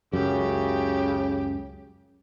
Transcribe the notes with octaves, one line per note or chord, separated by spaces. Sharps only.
C#2 F#2 C#3 G4